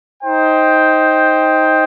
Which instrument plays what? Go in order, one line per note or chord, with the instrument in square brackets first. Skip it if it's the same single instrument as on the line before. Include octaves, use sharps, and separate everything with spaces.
[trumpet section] D#4 C5 G5